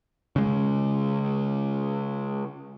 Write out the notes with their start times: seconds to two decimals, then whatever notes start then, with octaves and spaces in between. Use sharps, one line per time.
0.36 C#3 G#3